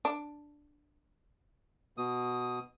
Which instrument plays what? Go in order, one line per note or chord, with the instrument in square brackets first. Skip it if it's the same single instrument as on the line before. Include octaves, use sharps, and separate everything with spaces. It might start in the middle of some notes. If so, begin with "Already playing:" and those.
[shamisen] D4
[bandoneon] B2 D#6